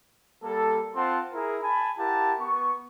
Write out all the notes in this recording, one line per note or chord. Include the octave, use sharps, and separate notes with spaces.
G3 A#3 A4
C4 F4 F#5 A5 C6
E4 G#4 A#4
G#5 A5 B5
E4 G4 A#4 F#5 A5
B3 C#6